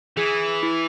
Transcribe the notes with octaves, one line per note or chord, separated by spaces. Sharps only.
E3 G#4
E4